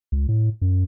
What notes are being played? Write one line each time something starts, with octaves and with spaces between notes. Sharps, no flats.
C#2
A2
F#2